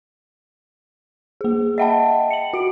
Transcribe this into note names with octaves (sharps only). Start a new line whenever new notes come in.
A#3 G#4
D#5 E5 F#5 G5 A5 B5
C#7 F#7
F#4 D7